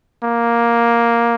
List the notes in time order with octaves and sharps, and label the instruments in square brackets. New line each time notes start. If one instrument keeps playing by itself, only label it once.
[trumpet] A#3